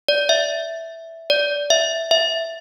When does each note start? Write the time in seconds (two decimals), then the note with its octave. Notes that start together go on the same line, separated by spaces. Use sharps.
0.08 D5
0.29 E5
1.30 D5
1.70 E5
2.11 E5